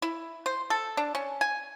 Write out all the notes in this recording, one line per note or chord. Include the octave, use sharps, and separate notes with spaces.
E4
C5
A4
D4
C#4
G#5